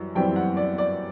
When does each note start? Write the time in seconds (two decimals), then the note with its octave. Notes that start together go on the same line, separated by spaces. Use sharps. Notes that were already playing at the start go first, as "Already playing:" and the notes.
Already playing: F#2 E3 G3
0.15 F#2 E3 G3 C4 G5
0.36 F#5
0.57 D5
0.78 D5